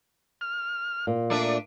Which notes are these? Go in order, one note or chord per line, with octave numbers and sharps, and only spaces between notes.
F6
A#2
A3 D4 E5 D6